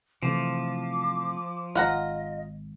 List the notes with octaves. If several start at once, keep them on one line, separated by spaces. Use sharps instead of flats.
C3 E3 F3 A3 D6
G#1 F4 D#5 F#5 A#5